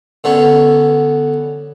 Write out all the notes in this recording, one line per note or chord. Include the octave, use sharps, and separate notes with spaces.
D3 B3 C#4